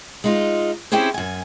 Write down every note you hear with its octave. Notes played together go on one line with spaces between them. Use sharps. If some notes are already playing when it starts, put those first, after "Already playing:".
G#3 D#4 F4
C4 C#4 E4 G4 G#4 C5
F#2 G#5